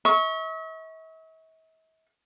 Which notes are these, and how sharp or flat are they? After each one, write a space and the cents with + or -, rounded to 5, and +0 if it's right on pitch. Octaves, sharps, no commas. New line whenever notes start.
E5 -45 C#6 +0